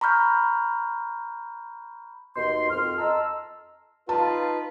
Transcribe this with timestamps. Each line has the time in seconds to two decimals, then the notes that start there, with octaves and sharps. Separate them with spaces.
0.01 A#5 B5 C#6 F6 G6
2.36 D#2 B2 D#4 C6
2.70 F2 F6
2.98 D#5 A5 A#5 C6 E6
4.09 D#4 F4 B4 A5